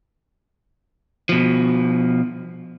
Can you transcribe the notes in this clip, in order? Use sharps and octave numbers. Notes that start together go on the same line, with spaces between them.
B2 F3